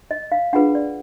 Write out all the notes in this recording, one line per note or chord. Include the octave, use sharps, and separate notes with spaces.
D#5
F5
D4 F4 G#4 B4 F#5
D5